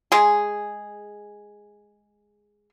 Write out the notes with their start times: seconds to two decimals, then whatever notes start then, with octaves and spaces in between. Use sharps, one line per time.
0.12 G#3 G#4